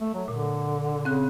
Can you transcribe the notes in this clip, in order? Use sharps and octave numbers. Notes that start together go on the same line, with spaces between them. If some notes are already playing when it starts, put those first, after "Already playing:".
A3
F#3
A#2 D3
C#3 C4 F#6